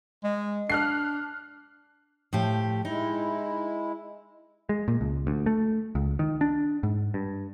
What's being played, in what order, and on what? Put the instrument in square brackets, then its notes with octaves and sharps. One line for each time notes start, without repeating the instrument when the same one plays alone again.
[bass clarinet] G#3
[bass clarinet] D4 [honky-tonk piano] F6 F#6 C7
[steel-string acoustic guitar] A2 F3 G4
[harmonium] G#3 E4 [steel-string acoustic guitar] D#4
[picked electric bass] G#3
A#2
C#2
D2
A3
C#2
D#3
D4
G#2
G2